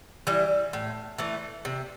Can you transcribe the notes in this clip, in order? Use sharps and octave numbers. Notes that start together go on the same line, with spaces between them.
E3 G3
A2
E3 A3
C3